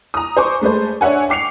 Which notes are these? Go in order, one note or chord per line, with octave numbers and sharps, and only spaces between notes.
A#5 D#6
C5 G#5 C#6 D6
G#3 A3 B4 C5
D4 C#5 E5 F#5 G#5
G5 D6 C7 C#7 F7